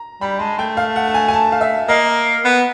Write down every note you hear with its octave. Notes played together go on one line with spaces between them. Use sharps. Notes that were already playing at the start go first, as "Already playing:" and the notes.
Already playing: A#5
G3 B5
G#3 A5
A3 G5
F5
F#5
A5
G#5
G#5
A5
F5
E5
A#3 D#5
B3